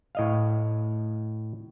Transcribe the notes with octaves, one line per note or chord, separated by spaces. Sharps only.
A2 D#5 F5